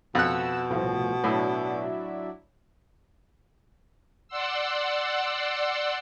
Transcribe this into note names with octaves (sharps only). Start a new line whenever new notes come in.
F2 B2 F#5 E6 F#6
C2 A2 F3
A2 F#3 D4 E4
D5 F#5 C6 E6